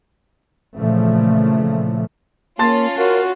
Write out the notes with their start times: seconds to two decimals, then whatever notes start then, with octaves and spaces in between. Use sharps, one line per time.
0.75 A#2 C#3 E3 F3 A3
2.59 A#3 C#4 F4 A5 C6 A6
2.97 F#4 A#4